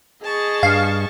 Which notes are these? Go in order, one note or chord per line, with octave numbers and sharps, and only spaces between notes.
G#4 D#5 A5 C#6
G2 F5